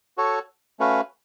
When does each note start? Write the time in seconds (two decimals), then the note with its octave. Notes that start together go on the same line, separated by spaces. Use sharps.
0.17 F#4 A4 C#5
0.79 A3 C#4 F#4 B4 F5